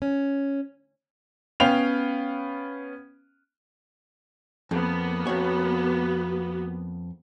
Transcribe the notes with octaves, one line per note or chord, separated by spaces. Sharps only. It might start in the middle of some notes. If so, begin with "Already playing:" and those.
C#4
B3 C#4 F5 G5 F7
F2 A#3 B3
F2 F#4 C#5